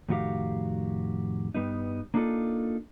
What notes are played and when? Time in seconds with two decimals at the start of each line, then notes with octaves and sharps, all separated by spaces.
0.09 F2 A2 D#3 F#4 G4 F5
1.54 G2 G3 B3 D#4
2.14 A#3 D4 D#4 F4 A4